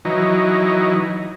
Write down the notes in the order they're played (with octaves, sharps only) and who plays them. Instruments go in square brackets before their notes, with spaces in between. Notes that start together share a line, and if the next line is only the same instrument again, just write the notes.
[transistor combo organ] E3 F#3 D#4